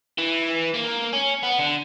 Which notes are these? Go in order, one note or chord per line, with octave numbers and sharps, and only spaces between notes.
E3
A#3
C#4
B3
D3